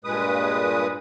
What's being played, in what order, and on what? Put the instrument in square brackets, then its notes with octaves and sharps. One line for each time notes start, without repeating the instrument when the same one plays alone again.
[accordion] G2 A#2 G#3 B4 D#6